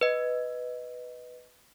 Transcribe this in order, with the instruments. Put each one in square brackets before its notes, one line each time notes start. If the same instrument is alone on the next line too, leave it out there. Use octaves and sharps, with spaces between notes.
[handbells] B4 D#5